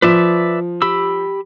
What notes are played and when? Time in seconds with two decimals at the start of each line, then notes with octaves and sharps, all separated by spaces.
0.02 F3 B4 D5 E5
0.82 G4 B5 E6